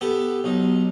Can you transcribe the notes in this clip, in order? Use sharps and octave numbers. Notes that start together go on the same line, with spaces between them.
B3 G4 A4
B1 D#4